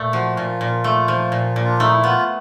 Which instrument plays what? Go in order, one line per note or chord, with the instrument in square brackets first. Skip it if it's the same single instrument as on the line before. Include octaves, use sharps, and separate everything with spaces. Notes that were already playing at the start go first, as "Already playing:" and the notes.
Already playing: [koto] A#2 A3
[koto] F3 [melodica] F#4
[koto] A#2 [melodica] F4
[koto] A#2
A3
F3
A#2
A#2
[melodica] D4
[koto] A3 [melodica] D#4
[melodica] E4
[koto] B3 [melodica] F4